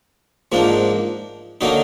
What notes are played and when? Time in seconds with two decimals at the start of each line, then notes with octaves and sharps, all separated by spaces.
0.52 G#2 F3 A#3 D4
1.61 D3 F#3 A#3 D#4